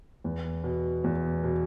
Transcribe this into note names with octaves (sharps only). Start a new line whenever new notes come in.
E2
B2
E2
B2